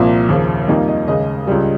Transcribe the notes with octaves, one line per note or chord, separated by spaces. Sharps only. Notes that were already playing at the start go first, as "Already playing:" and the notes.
Already playing: C2 A#2 F3 A#3
D#2 C#3 F3
F2 D#3 G3 A#3 D#5
D#5
D#2 C#3 G#3 D#5
C#2 C#3 G3